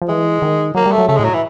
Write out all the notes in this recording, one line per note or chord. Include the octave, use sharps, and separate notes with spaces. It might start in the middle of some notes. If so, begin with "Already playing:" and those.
F3
E3 G#3
D#3
F#3 A#3
G3
A3
F#3
C#3 A3
A2 G#3
F#3
E3